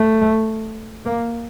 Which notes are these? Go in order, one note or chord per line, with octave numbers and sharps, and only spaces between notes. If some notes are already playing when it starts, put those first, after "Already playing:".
Already playing: A3
A#3